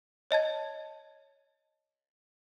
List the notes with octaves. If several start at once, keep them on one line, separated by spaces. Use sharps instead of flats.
C#5 D#5 A5 G#6